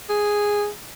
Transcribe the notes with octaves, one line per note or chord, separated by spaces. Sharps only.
G#4